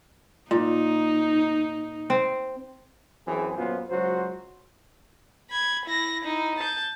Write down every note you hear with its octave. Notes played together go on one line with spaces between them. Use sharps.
A#2 D#4
C4
F#2 E3 C4 G#4
F#2 A#2 B3 F4 C5
C#2 F#3 F#4 C5
B5 G#6
E4 A#6
D#4 E4
A5 G6